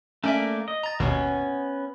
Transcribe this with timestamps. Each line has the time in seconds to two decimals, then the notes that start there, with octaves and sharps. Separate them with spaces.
0.24 A3 A#3 C#4 D5 E5
0.68 D#5
0.83 A#5 A6
1.00 G#1 D#2 B2 B3 C#4